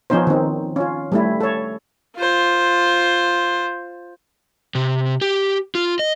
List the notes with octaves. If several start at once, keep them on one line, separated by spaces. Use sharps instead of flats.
F3 B3 C#4 D#4 C5
D#3 C4
C#4 F4
G3 A3 E4
A4 C#5
F4 C5
C3
G4
F4
D#5